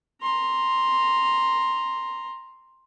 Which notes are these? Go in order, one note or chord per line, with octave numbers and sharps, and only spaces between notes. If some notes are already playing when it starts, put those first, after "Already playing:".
A#5 C6